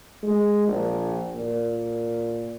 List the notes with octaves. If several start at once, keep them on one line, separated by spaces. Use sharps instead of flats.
G#3
A#1
A#2